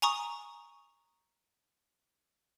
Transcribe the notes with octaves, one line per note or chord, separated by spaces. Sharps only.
G#5 A#5 C#6 D#6